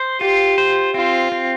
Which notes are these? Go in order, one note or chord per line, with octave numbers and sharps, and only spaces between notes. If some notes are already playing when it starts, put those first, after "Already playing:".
Already playing: C5
F4 G4
C5
C4 F4
C4